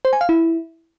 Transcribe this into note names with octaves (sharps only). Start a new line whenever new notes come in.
C5
G#5
F5
E4